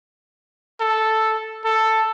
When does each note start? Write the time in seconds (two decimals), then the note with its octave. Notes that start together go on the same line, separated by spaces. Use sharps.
0.80 A4
1.65 A4